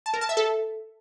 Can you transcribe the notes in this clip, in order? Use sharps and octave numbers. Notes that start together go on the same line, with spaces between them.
A5
A#4
A5
E5
A4